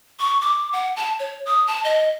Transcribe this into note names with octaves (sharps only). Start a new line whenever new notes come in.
C#6
D6
F#5
A5
C#5
D#6
A5
D#5